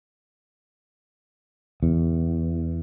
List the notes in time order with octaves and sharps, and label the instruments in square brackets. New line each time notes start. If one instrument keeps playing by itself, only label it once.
[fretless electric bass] E2